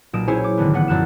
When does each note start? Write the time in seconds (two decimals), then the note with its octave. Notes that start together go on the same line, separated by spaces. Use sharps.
0.13 B1 A#2 A#3 D#6 D7 E7
0.28 C#4 E4 G#4 C5 C#5 G#5
0.44 D6
0.57 G#1 D3 B3
0.73 A1 B3 F#5
0.88 A#1 F#2 F#6 E7